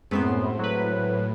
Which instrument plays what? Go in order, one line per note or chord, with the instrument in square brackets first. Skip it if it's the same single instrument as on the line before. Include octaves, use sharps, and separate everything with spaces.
[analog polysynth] F#2 B3 [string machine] A2 [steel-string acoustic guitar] G#3 C4 C5
[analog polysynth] F#3 B4